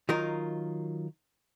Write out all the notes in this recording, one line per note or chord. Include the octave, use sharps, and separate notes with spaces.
D#3 F#3 D#4 F4 A#4